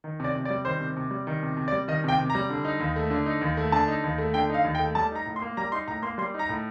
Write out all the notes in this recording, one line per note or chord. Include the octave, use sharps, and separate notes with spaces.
D#3
C3 D5
C3
D5
G3
D#3 C5
C3
C3
G3
D#3
C3
C3
D5
G3
D#3 D#5
C3 G5
C3
A#5
G3
D3
D#4
D#2
A3
D3
D#4
D#2
A3
D3 A5
D#4
D#2
A3
D3 G5
D#4 F5
D#2
G5
A3
G3 A5
D#4 A#5
A2
C6
A#3
G3 A#5
D#4 C6
A2 A#5
A#3 C6
G3 C6
D#4
A#5
A2